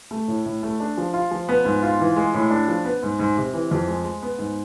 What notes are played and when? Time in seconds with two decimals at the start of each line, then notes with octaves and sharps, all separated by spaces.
0.11 A3
0.28 A2
0.46 A2
0.63 A3
0.80 D4
0.97 F3
1.13 F4
1.31 F3
1.49 B3
1.65 G#2
1.83 F4
2.00 E3
2.16 G#3
2.34 A2
2.50 D4
2.68 F3
2.85 B3
3.02 G#2
3.19 G#2
3.37 C3
3.53 E3
3.71 F2
3.87 G#3
4.04 G#3
4.22 B3
4.38 G#2